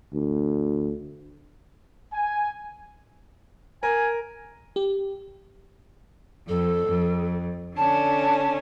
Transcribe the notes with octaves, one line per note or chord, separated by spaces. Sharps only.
D2
G#5
A#4 G#5
G4
F2 A4
F2
D3 C#4 A5